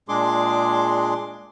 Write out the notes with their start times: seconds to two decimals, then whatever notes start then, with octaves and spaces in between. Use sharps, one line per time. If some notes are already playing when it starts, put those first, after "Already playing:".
0.09 A#2 G#3 D4 G#4 C6 D6